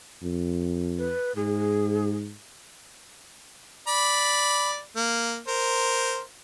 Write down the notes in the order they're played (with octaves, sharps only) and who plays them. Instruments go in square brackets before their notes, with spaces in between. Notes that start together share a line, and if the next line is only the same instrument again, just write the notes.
[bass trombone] F2
[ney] B4
[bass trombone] G#2 [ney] G#4
[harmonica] D5 B5
A#3
A#4 C5